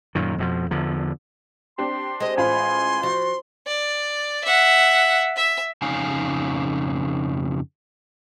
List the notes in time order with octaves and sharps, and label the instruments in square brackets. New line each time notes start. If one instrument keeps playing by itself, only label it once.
[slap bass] F#2 A#2 D#3
F2 B2 F3
E2 D3 F3
[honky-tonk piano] C4 D4 G4 [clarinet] C6
[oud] G#3 C5 [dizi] D#5
[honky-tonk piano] A1 F4 B5 [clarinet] G#5 [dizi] C6
[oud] F3 [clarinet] F#4
[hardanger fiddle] D5
E5 F#5
E5
[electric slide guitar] F2 C#3 D#4 F5 G#5